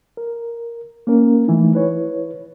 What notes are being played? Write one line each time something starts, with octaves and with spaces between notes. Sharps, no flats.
A#4
A#3 C#4 A#4
E3 F3 A3 D#4
E4 B4 C#5